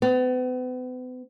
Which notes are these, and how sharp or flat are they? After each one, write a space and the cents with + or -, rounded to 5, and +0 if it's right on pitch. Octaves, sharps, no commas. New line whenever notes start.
B3 +40